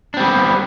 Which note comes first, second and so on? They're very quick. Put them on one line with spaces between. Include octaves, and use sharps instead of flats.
D4 C4 G3 B3